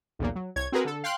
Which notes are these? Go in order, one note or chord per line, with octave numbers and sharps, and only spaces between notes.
B1 E2 A#2
F#3
C2 C#5 G#6
C4 F#4 G#4 A#4 B4
D3 A4
F5 G5 C6 F#6